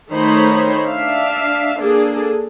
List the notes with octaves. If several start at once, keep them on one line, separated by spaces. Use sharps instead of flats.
D#3 A3 D#4 C5 C#5 B5
D4 E5 F5
A#3 D4 G#4 A4